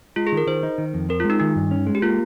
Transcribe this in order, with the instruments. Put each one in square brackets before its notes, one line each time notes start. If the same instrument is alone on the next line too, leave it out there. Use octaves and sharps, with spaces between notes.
[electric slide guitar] G#3 [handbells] F4
[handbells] G#4
[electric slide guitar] D#3
[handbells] A#4
[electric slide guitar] D#3 [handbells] C5
[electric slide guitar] D#4
D#3
F2
[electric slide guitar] C4 [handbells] A#4
[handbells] F4
[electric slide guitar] G#3
[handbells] D#4
[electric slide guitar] D#3 [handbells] D#4
[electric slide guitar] G2
C#4
G#3
[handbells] G4
[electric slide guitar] A#3 [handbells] F4